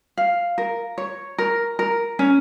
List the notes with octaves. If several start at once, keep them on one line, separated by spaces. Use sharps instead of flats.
F5
A#4
C#5
A#4
A#4
C#4